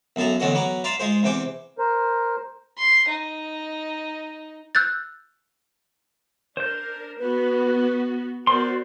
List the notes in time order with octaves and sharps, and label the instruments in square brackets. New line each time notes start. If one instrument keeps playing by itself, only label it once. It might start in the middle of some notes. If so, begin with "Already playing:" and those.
[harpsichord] B1 F#2 G#4 A4 A#5
A1 E2 D3 C#4 F#4 D#5
F#3 B3 A#5 D6
D5 E5 F5 A#5 C6
G#3 F4 G#4 C5
E2 C3 C4 G5 G#5 D6
[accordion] A#4 C5
[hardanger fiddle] C6
D#4
[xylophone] E6 F#6 G6 A6
[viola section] D4 A#4 [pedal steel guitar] C5 G6
[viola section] B3 F#4 [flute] B4
[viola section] B3 F#4 A#4 [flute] C5 [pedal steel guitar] D5 C6